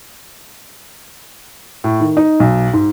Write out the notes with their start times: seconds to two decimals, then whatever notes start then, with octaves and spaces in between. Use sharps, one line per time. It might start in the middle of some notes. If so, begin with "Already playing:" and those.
1.84 A2
2.00 D#3
2.17 D#4
2.40 B1
2.73 G#2